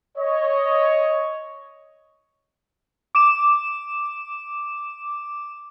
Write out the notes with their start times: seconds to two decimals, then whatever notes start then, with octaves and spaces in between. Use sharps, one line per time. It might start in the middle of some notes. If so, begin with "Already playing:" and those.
0.18 C#5 D#5
3.15 D6 E7